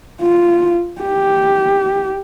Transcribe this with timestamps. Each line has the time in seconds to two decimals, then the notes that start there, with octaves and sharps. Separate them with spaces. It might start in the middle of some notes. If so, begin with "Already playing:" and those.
0.22 F4
1.02 G4